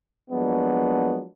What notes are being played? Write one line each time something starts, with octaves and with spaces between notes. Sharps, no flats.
F3 F#3 G#3 A#3 B3 D4